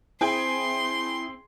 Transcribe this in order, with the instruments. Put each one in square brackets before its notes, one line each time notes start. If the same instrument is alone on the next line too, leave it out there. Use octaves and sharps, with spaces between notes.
[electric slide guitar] C4 [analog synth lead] E4 [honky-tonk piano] G#4 G5 G#5 [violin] C6